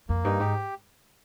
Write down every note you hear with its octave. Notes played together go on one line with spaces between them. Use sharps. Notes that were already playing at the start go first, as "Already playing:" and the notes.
F2 A#3
G2 D#4
G#2 G4